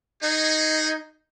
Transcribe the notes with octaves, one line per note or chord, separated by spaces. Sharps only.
D#4 F#4 G#4